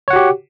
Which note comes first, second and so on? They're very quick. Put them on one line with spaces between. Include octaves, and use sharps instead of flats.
C#5 F#5 F#4 G4